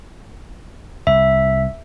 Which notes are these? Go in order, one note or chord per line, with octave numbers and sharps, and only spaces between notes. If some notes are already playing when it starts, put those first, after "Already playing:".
C2 E5